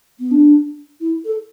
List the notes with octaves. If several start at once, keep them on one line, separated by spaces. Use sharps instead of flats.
B3
D4
E4
A4